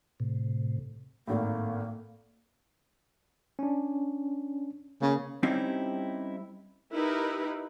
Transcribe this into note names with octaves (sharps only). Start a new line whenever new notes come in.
A2 C3
G#1 A2 A#3
C#4 D4
C#3 A#3
G3 C4 C#4 D#4 E4 G4
D#4 E4 G4 A#4 B4